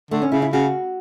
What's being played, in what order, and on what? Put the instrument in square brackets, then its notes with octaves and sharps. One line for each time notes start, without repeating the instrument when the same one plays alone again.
[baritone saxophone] D3 [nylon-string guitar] A3
[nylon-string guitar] C#4
[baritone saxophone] C#3 [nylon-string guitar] E4
[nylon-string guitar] E4
[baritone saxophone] C#3 [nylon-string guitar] F#4